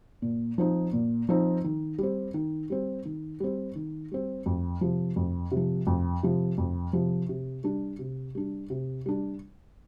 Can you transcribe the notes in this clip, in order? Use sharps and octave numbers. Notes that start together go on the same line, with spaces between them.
A#2
F3 C4 D#4
A#2
F3 C4 D#4
D#3
G3 C4
D#3
G3 C4
D#3
G3 C4
D#3
G3 C4
F2
C3 F3
F2
C3
F3
F2
C3 F3
F2
C3 F3
C3
G3 D4
C3
G3 D4
C3
G3 D4